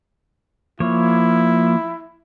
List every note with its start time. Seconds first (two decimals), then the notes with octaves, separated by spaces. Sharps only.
0.80 F3 A#3 E4 C#5